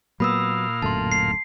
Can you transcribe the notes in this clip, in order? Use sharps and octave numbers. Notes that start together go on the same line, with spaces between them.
A#2 F#3 A#3 B3 F5 B5 D#6 E6
D1 F#2 A3 A5 C6
C7